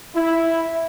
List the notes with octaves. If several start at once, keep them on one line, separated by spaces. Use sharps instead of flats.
E4